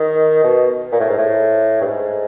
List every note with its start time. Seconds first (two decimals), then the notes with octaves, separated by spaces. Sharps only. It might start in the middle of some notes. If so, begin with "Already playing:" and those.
Already playing: D#3
0.44 B2
0.92 A#2
1.00 A2
1.10 G#2
1.18 A2
1.81 G2
1.87 G#2